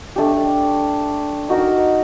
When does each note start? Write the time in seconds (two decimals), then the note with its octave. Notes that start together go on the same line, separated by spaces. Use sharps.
0.16 A3 D4 G4
1.49 D#4 F#4 A#4